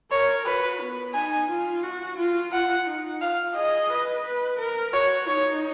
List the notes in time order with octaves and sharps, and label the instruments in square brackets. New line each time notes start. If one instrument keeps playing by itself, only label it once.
[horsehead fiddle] A#4 [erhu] C#5
[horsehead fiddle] F#4 [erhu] B4
[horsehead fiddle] B3
[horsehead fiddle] D#4 [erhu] G#5
[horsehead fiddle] F4
F#4
F4
[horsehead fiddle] F4 [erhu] F#5
[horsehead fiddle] D#4
[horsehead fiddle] F4 [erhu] F5
[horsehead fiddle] G#4 [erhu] D#5
[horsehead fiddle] B4
B4
A#4
[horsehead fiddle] F#4 [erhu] C#5
[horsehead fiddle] D#4 [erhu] C#5